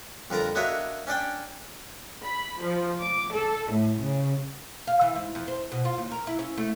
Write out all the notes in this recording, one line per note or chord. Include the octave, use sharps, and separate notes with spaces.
F2 D3 A#4 A5 A#5
A#3 D4 F#4 C#5 D#5 E5
C#4 D4 D5 G5
B5
F3
D6
A4
A2
C#3
F5
E3
G#2
F2
C5
B2
F4
D#2
A#4
E4
C#4
A3